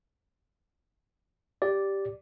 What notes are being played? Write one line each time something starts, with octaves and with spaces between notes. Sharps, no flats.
G4 D5